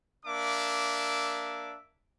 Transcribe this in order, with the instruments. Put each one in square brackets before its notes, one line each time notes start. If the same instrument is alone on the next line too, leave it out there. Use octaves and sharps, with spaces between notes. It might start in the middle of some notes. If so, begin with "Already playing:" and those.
[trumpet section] A#3 D4 E5 D6